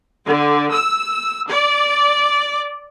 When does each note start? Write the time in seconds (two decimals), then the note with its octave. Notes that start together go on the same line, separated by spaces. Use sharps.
0.25 D3
0.71 E6
1.49 D5